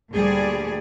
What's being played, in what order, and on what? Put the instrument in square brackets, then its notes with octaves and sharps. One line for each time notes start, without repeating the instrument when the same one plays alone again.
[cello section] D2 A#2 G3 G#4 D5